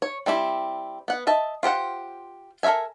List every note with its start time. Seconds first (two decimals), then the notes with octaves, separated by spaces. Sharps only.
0.02 C#5
0.26 G3 C4 E4 G4
1.08 B3 F#5
1.27 D#5 E5 A5
1.63 F4 G4 C5 F#5
2.63 A4 A#4 C#5 E5 G#5